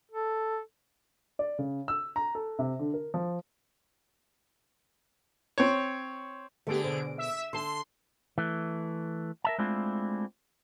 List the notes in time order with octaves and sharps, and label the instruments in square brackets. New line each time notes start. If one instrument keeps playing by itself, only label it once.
[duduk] A4
[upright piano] D5
C#3
E6
A#5
A4
C3
D3
A#4
F3
[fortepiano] C4 C#5
[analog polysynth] D3 G#4 D7 [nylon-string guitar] A3 B3 G4
[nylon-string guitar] B2 D4 C5
[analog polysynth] E5 E6
[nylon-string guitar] D3 A5 [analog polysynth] C6
[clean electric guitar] E3 A3
A#4 E5 A5
G#3 A3 C4 D4 E4 F4